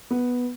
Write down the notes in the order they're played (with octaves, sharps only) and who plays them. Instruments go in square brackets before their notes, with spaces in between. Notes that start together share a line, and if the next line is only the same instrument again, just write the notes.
[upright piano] B3